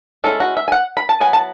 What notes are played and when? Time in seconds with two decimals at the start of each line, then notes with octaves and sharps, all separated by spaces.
0.24 G#3 C#4 E4 A4
0.40 F#4
0.57 E5
0.68 G#5
0.72 F#5
0.97 B5
1.09 A5
1.20 F#3 B3 E4 G#5
1.33 A5